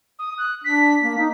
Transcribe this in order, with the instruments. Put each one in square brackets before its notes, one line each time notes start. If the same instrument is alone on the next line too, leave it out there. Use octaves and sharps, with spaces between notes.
[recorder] D#6
F#6
[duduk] D4 [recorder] B6
[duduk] A#3
D#4